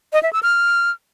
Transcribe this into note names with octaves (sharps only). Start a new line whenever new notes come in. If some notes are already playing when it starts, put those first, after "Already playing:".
D#5
E5
E6
F6